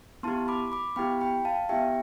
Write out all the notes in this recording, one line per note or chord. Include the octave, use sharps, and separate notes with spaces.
B3 E4 G4 A5 C6
B5 D6
B5 D6
B3 E4 G4 G5 B5
G5 B5
F5 A5
B3 E4 G4 E5 G5